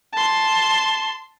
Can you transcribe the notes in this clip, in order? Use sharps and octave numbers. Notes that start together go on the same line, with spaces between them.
A5 C6